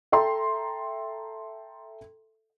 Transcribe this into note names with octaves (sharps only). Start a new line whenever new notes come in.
A4 E5 G5 A#5 C6